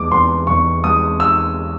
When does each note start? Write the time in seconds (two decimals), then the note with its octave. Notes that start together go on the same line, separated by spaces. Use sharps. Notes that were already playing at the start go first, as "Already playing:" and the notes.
Already playing: E2 G#3 D6
0.12 E2 C6
0.47 E2 C#6
0.84 G#3 D#6
1.20 E6